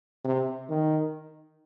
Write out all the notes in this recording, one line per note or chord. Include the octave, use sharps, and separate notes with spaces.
C3
D#3